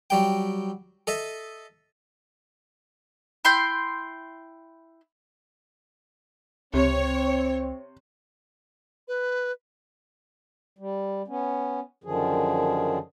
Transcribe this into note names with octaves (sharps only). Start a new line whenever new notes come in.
F#3 G3 G5
A4 D#5 E5
E4 G5 C6 G6
C#2 C3 C4 C#5
B4
G3
B3 C#4
F#2 D3 D#3 F3 G#4